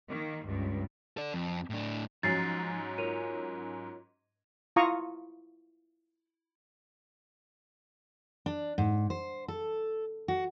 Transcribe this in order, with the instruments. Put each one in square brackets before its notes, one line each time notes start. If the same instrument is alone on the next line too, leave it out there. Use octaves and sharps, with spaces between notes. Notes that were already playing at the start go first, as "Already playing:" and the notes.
[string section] D#3 A#3
C#2 G2
[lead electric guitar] A4 D5
F2
A2 D4
[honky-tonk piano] G#2 F#3 C#4 [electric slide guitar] F3 [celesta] A6 C7
[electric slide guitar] F4 A#4 C#5 [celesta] D#7
[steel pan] E4 F4 F5 A#5 C#6 D#6
[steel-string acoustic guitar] D4
G#2
C5
A4
F#4